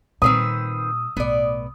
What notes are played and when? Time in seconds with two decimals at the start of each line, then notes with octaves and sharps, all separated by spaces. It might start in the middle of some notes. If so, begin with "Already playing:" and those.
0.22 A#2 D#3 G3 C4 B4 D#6 E6
1.17 B1 A2 B3 D5